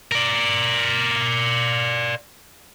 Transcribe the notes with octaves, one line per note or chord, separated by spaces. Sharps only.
A#4 D5